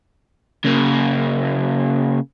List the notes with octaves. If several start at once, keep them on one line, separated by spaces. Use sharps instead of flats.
C#3 A#3